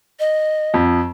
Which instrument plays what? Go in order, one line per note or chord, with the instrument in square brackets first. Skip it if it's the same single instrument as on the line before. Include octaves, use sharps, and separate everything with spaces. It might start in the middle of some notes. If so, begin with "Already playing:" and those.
[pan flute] D#5
[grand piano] F2